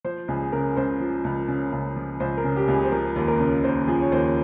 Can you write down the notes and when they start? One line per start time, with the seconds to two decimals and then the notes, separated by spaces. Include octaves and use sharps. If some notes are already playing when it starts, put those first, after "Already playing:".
0.04 F3 C5
0.28 C#2 G#4
0.42 G#4
0.52 C#3 A#4
0.77 C#2 C5
1.00 F3
1.24 C#2
1.48 C#3
1.72 C#2
1.96 F3
2.20 C#2 C5
2.38 A#4
2.44 C#3
2.56 G4
2.68 C#2
2.74 G#4
2.85 C5
2.92 F3 A#4
3.16 D#2
3.28 A#4
3.40 C#3
3.64 D#2 C5
3.88 F3 G#4
4.01 C#5
4.12 D#2 C5